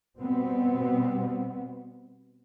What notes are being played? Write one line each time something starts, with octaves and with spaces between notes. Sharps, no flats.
B2 G3 B3 C4